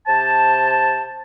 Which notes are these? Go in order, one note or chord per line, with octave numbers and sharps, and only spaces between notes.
C3 C5 A5